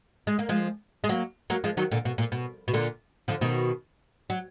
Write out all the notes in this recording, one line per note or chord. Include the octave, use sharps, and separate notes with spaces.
G#3
A#3
F3 G#3
G#3
F#3 A#3
F#3 A#3
F3 G#3
D#3 F#3
A#2 D3
B2
A#2
B2
B2
A#2 D3
D3 F3
B2 D#3
F#3